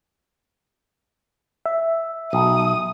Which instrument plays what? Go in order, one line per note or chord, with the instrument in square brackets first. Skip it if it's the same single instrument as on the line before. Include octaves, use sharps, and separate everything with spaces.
[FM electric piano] E5
[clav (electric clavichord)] B1 [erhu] D#6